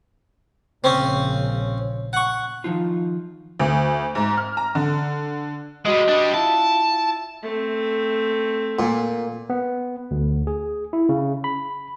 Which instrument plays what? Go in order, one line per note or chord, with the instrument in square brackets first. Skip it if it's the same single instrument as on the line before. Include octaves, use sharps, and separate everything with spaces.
[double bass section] A#1 A#2 C#3 [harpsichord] C4 C#4
[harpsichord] F#5 C#6
[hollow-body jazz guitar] D#3 F3 D#4 F4
[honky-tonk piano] D2
G#2
F6
A#5
D3
[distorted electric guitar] G3 G#3 [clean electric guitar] F#4 D#5
[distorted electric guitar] G3 D4
[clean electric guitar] E4 F4 [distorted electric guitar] A5
[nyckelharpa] A3 C4
[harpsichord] A#2
[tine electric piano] B3
D2
G#4
E4
C#3
B5